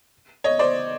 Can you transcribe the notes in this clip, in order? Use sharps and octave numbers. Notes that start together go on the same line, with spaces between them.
C#5 D#5
C5 D5